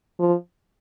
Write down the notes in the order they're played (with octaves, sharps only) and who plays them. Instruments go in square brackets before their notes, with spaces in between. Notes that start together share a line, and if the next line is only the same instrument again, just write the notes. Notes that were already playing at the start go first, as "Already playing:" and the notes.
[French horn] F3